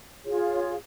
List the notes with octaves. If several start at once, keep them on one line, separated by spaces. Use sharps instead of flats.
F4 G#4 C#5